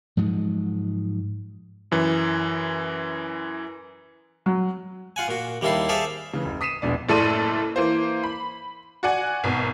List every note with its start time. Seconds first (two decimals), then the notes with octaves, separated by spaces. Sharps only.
0.17 G#2 F3 F#3 G#3
1.91 F#2 E3
4.46 F#3
5.16 F4 F#5 G#5
5.28 A#2 F#4
5.61 D#2 G3 A#3 E4 A4 C6
5.89 G#4 A4 C5 D5 E5 F5
6.34 C#3 E3
6.45 F#1
6.61 D#6 B6 C7 D#7 E7
6.82 E1 A#1 B2 D5
7.09 F#1 A2 A4 D5 C6 D#7
7.76 E3 A#3 C5
8.23 B5
9.03 F#4 D5 F#5 G#5
9.44 G#1 B2